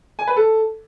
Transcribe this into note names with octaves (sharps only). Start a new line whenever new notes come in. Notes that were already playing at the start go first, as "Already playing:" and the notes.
G#5
B4
A4